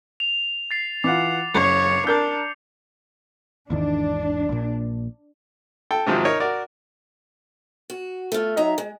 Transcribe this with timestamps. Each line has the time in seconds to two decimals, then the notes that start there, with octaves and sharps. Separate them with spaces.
0.20 F7
0.71 A6 C7
1.04 E3 F4 F#5 D6
1.55 F#1 C#5 D6 C7 C#7
2.07 D4 A#4 G6
3.70 G#1 E2 D#3 D4
4.49 A#1 A#2
5.91 A4 G5
6.06 G#2 C3 D#3 F3 F#3
6.25 D#4 A#4 C#5
6.40 F#4 A#4 D5
7.90 F#4
8.32 A3 F4
8.57 F#3 D#4 E5 A#5
8.78 G#3